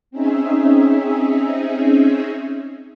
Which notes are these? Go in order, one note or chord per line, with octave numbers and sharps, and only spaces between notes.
C4 C#4 D#4 G#4 E5